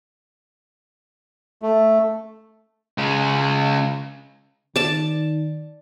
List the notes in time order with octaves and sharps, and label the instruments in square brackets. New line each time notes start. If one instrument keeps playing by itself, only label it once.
[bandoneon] A3
[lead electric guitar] C#3 G#3
[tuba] D#3 [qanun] D5 A5